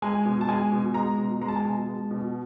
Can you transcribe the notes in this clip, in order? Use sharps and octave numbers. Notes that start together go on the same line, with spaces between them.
G#3 G#5
B2
A5
G#3 G#5
B2
G#3 A#5
B2
G#3 A#5
A5
G#5
B2 A5
G#3
B2